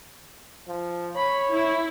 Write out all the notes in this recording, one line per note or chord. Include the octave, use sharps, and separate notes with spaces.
F3
C#5 B5
E4